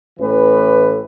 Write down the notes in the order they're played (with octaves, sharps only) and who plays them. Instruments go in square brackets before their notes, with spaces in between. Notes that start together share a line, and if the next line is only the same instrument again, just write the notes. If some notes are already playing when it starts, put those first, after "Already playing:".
[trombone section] A1 A2 E3 B4